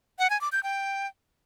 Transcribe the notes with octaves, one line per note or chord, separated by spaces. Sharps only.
F#5
G#5
D6
G6
G5